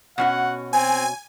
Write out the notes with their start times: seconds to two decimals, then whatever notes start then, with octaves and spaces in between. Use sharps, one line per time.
0.18 B2 C#4 F#4 F#5
0.73 C4 G#5